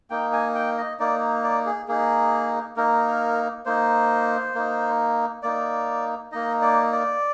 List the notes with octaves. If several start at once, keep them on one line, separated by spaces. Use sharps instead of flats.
A#3 D#4 G5
G#5
G5
D#5
A#3 D#4 D5
D5
G#4
A#3 D#4 G#4
A#3 D#4 A#4
A#3 D#4 C5
A#3 D#4
A#3 D#4 D5
A#3 D#4 D#5
D5
D5